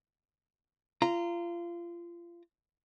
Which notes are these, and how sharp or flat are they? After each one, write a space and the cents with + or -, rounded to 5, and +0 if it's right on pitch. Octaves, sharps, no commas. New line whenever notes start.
F4 -25 A#5 +0